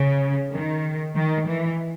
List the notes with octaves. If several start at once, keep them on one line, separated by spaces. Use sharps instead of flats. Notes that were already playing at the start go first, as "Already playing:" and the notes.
Already playing: C#3
D#3
D#3
E3